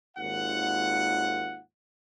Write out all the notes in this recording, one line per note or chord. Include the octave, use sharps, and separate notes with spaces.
G#1 D#2 F4 F#5